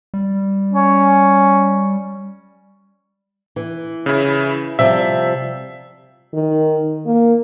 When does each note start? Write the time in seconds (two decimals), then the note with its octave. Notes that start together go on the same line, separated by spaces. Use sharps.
0.14 G3
0.74 C#4
3.56 E3
4.06 C#3 E4
4.79 C3 F3 G3 E5
6.34 D#3
7.06 A#3